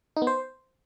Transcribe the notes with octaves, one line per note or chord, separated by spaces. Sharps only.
D#4
B3
C5